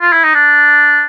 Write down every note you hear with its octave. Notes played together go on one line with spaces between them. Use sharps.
F4
E4
D#4
D4